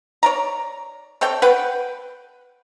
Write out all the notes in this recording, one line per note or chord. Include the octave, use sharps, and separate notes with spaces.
C#5 D5 A#5
C4 A4 C#5 G5
B4 F#5 G5